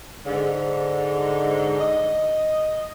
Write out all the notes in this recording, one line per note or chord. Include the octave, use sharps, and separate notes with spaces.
G#2 D3
D#5